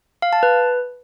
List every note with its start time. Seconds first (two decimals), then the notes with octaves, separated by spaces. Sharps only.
0.22 F5
0.33 A5
0.43 B4